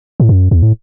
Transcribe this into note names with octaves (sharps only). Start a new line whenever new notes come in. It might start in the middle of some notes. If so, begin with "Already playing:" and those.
A2
F#2
E2
A2